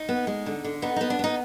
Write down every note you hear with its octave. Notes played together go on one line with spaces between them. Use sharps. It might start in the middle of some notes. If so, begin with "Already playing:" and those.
Already playing: D#4
B3
G#3
D3
D3
B3 D#4
B3 D#4
D4
B3 D#4